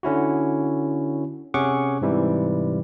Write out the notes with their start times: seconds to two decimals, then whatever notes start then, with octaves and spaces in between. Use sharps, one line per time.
0.03 D3 C#4 E4 F#4
1.54 C3 C#4 G#4 F#5 C#6 D6
2.02 G#2 C3 E3 G3